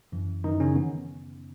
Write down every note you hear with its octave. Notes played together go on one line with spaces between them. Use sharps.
F#2 E3
F#2 D#3 E3 D#4
C#3 C#4
B3